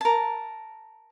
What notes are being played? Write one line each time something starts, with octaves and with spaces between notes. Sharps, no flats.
A#4 A5